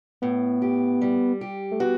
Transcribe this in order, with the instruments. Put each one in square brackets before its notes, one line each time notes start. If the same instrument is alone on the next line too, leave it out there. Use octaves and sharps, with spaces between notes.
[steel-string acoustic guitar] A2 [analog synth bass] B3
[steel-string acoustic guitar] G4
G3
G4
[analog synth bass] A3
[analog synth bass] B3 [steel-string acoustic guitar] F#4